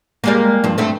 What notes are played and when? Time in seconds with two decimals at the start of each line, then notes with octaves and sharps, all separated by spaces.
0.24 G3 G#3 A#3
0.64 G2 F3
0.78 G2 A3 C4